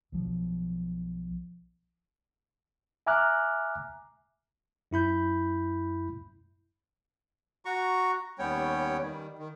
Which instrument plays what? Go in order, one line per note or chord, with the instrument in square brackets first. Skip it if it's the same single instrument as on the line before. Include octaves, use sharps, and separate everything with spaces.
[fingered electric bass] B1 F3
[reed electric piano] E5 G#5 A#5 D6 F6 F#6
[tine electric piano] F#2 E4 B5 G6
[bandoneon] F#4 A#5 C#6
D#2 G3 B3 C#4 C#5 G5
D#3 G3
D#3